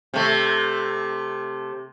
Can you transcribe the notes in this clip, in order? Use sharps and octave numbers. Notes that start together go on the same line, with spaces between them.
C3 A3